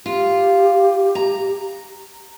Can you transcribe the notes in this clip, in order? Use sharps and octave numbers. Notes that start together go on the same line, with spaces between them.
F4 G4
A#5